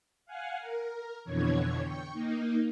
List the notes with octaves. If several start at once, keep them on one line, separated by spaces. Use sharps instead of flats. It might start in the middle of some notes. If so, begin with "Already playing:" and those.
F5 F#5 G#5
A#4
F2 B2 D3 E3 C#5 G#6
G5 C#6
A#3 D#4